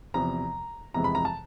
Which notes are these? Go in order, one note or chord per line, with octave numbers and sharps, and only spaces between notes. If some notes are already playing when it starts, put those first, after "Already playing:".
E2 C3 F3 A#5
F2 C3 E3 G#3 A#5
B5
A#5
A5